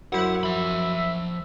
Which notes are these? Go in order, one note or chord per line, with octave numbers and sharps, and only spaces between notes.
F#2 E4 C5 F#5
F3 E5 B5